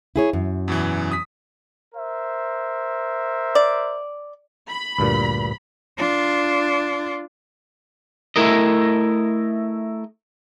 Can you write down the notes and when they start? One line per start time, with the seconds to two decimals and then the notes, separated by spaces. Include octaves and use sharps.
0.16 E4 G#4 C#5
0.33 F#2
0.68 E2 B2 E3
1.11 D#6 B6
1.95 A#4 C5 E5
3.55 D5
4.69 B5
4.98 D2 G2 A#2
5.98 D4 F4
8.36 A3 E4 A#4 D#5